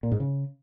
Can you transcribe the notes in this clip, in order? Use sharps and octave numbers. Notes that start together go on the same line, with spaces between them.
A#2
G#2
C#3